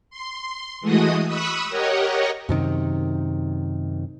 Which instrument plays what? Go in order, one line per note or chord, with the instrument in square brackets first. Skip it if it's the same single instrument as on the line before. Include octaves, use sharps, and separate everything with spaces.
[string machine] C6
E3 G#3 A3 F#4 D#5 D#6
B5 C#6 D#6 E6 F#6
G4 A#4 C#5 D#5 F#5
[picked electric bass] F#2 C3 D#3